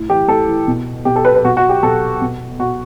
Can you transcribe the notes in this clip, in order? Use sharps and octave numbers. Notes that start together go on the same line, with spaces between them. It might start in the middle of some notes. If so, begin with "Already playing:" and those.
Already playing: A2
E3 G4
A2 A4
E3
B2
B2 G4
A4
B4
B4
B2 F#4
F#4
G4
B2 A4
B2
B2 F#4